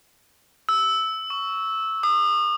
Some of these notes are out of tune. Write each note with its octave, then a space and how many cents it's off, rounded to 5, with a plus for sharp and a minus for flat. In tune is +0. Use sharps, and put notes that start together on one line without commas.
E6 -15
C#6 +15
D#6 -40